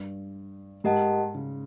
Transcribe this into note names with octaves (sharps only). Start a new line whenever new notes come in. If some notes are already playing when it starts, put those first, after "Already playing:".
Already playing: G2
G#2 G4 A#4 D#5 F#5 A5
C#3